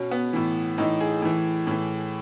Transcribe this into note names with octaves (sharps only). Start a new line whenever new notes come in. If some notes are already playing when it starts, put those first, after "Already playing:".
Already playing: B2 C#4
B3
A2 E3
A2 E3 D#4
G#4
A2 E3
A2 E3